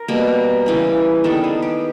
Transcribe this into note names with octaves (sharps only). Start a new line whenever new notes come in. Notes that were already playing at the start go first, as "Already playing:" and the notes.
Already playing: A#4
B2 G3 A#3
C#3 E3 G3
D#3 G3 B3 A4
G#4
G4